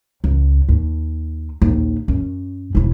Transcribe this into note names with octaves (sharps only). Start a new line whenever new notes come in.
C#2
D#2
A#1 D#2
F#2 C#4
E1 E4